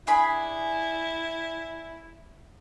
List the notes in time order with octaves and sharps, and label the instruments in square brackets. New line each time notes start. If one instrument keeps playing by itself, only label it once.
[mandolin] D4 G#4 B5 [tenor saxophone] E4